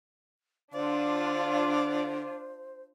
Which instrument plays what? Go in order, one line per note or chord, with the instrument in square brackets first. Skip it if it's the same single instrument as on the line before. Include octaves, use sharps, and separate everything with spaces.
[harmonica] D3 D5 [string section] D4 F4 [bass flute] C5